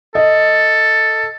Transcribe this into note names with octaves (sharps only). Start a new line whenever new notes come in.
A4 D#5